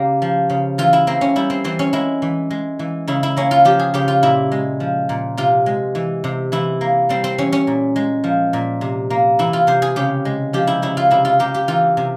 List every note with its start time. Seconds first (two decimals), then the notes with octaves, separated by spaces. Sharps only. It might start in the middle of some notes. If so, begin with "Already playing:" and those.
Already playing: C#3 A#3 G4
0.22 F3
0.50 C#3
0.78 E3 F4
0.93 E4
1.07 A#3 C4
1.21 C#4
1.36 G3 E4
1.50 C4
1.64 E3 C4
1.79 C#4
1.93 G#3 E4
2.22 E3
2.51 G#3
2.79 E3
3.08 C#3 E4
3.23 E4
3.37 A#3 C#4
3.51 F4
3.65 F3 G4
3.79 G#4
3.94 C#3 G4
4.08 F4
4.23 A#2 E4
4.52 G#3
4.80 F3
5.09 A#2
5.37 C3 F4
5.66 G#3
5.95 E3
6.24 C3
6.52 E3 E4
6.81 A#3
7.09 G3 C4
7.24 C4
7.38 E3 C#4
7.53 C#4
7.67 A#2
7.96 G#3
8.24 F3
8.53 A#2
8.81 C3
9.10 A#3
9.39 E3 E4
9.53 F4
9.67 C3 C5
9.82 G#4
9.96 C#3 G4
10.25 G#3
10.53 F3 G4
10.67 E4
10.82 C#3 E4
10.97 F4
11.11 C3 E4
11.25 F4
11.39 A#3 G4
11.54 G4
11.68 E3 F4
11.97 C3